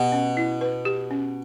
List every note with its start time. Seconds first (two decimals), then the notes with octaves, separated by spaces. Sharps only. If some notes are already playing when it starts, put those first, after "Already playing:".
Already playing: B2 G4
0.12 C#4
0.37 E4
0.61 B4
0.85 G4
1.11 C#4